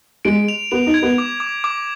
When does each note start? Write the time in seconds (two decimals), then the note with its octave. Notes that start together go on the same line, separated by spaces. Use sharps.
0.25 G#3 D7
0.48 F7
0.71 B3 F7
0.87 D#4
0.94 G#6
1.02 B3
1.18 D6
1.40 D6
1.64 D6